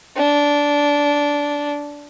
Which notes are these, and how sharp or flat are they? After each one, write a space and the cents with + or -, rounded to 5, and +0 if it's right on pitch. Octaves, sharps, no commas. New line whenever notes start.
D4 -15